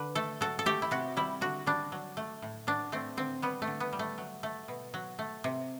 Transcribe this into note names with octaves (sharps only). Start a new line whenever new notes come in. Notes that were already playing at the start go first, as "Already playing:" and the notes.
Already playing: D3 B4
A3 A4
F#3 A4
A4
A3 G4
E4
C3 F#4
G3 E4
D3 F#4
G3 D4
F#3
A3
A2
F#3 D4
A3 C4
D3 C4
G3 B3
A3
D3
B3
G3
A3
F#3
A3
B2
F#3
A3
C3